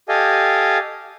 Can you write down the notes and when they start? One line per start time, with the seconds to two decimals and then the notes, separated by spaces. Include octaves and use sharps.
0.09 G4 A4 D#5 F5 G#5